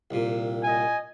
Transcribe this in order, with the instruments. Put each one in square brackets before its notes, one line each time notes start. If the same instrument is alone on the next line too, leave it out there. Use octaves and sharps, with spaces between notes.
[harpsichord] C2 A#2
[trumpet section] D#5 G#5